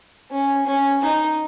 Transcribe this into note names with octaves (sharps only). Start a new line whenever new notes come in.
C#4
C#4
D#4